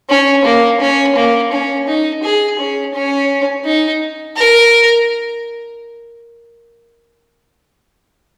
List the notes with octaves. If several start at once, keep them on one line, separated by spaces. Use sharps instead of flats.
C#4
A#3
C#4
A#3
C#4
D#4
G#4
C#4
C#4
D#4
A#4